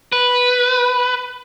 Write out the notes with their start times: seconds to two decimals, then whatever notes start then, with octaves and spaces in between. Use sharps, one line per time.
0.13 B4